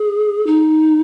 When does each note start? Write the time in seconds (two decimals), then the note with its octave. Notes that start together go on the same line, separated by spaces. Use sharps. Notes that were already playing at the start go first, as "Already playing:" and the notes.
Already playing: G#4
0.47 D#4